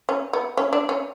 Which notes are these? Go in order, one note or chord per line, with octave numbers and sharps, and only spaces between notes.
C#4
B3
C#4
D4
C#4